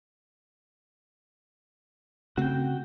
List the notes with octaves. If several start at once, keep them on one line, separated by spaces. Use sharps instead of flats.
C#3 A3 C4 F#4 G5